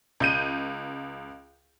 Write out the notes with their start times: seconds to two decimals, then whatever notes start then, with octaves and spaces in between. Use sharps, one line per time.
0.20 C#2 G6 D#7